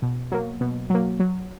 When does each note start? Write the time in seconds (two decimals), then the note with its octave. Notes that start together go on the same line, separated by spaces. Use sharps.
0.02 B2
0.32 F#3 A#3
0.61 B2
0.90 F#3 A#3
1.20 F#3